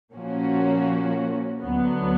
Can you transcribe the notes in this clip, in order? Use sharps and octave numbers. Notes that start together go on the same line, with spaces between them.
A#2 F3 A#3 C#4 F#4
D2 D3 F#3 B3